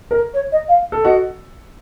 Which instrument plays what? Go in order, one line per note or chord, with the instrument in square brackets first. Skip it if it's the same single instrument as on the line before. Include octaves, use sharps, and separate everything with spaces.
[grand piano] A#4
[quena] C#5
D#5
F5
[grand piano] A4
[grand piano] F#4 [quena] D#5